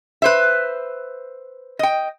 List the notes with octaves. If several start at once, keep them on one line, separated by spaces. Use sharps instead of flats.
B4 C5 E5
D#5 G5